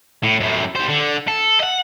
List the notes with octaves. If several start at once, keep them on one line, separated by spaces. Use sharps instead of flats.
A2
F#2 A2
G3 C5
D3
A4
D#5 F#5